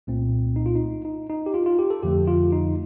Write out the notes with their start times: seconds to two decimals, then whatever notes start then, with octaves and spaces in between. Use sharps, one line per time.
0.07 C2 A#2 A3 C4
0.56 D#4
0.66 F4
0.75 D#4
1.05 D#4
1.30 D#4
1.46 G4
1.54 F4
1.66 F4
1.79 G4
1.90 A4
2.03 F2 D3 F3 A3 G4
2.28 F4
2.52 D#4